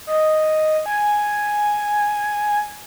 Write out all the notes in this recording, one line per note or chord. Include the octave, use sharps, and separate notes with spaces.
D#5
G#5